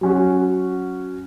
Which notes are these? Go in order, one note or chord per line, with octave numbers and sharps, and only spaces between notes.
F#3 C#4 F#4